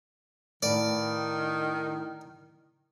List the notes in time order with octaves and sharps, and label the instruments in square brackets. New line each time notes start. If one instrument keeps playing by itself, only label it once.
[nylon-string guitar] A2 B4 F5 [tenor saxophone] D#3 [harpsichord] D5